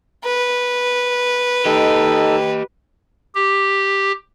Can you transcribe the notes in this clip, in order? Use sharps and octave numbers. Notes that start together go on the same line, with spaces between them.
B4
D#4 G4 A4 D#5
G4